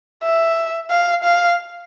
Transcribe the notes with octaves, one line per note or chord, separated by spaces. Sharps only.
E5
F5
F5